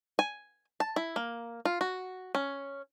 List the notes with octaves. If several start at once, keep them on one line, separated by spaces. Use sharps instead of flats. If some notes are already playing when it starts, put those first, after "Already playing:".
G#5
A5
E4
A#3
F4
F#4
C#4